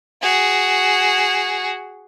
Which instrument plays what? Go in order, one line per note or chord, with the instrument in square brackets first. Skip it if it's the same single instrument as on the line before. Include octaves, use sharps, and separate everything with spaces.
[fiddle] F#4 G#4